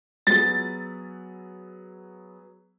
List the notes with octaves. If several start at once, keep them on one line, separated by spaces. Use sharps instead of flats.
F#3 B3 G#4 A6